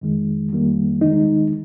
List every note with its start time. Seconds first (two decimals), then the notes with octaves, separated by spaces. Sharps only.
0.01 F2 D#3 G#3
0.52 F2 D#3 G3 A#3
1.01 D#2 D#3 G#3 D#4